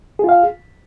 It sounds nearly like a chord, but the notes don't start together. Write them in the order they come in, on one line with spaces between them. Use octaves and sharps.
G#4 F4 F5